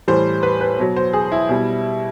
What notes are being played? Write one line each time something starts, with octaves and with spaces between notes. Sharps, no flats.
A2 E3 G3 C5
B4
B4
B2 F#3
C5
G#4
E4
B2 G3